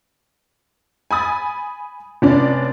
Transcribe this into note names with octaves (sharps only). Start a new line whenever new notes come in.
G#5 B5 D#6 A6
F1 C#4 D4 D5